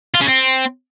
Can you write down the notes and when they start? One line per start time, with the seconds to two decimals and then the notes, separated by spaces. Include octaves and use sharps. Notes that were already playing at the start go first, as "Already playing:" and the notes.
0.14 F4
0.21 C#3
0.27 C4